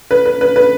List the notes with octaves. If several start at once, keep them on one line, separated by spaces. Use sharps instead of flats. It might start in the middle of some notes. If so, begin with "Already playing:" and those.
B4
B4
B4
B4